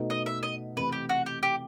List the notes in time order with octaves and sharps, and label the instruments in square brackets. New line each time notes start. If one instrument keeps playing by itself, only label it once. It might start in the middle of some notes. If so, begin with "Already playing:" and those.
Already playing: [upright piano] B2 A3 D#4
[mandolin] D#5
E5
D#5
[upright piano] C3 E3 A3 [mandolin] B4
[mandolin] G4
F#4
G4
G4